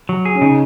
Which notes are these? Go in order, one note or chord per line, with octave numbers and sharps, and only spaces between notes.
F#3
G#4
C#4
C#3 D#4